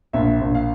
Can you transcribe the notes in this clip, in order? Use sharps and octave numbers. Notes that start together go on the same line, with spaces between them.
A#1 E5
A#1
F5